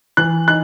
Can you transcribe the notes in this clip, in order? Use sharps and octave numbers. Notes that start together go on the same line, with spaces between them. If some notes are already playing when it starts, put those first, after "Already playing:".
E3 F#6
D#4 F#6